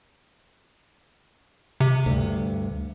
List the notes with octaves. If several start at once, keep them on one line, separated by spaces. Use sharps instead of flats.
C3
D2 G2